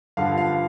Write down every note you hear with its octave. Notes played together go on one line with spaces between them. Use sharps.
G2 D3 F3 F5
F5